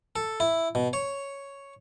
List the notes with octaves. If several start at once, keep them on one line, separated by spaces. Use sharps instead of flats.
A4
E4
B2
C#5